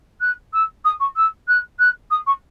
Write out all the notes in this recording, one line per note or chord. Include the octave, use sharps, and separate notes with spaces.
F#6
E6
D#6
C#6
E6
F#6
F#6
D#6
C#6